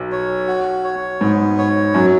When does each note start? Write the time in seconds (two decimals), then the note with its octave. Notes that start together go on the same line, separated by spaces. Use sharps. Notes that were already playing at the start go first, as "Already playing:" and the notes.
Already playing: B1
0.12 C#5
0.47 F#4
0.84 C#5
1.21 G#2 B3
1.58 C#5
1.94 F#2 F#3